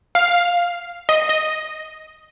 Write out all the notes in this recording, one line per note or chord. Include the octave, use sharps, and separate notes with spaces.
F5
D#5
D#5